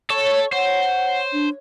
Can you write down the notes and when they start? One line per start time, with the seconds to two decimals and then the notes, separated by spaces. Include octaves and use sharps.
0.10 A4 C#5 A5
0.53 C5 F#5
1.33 D4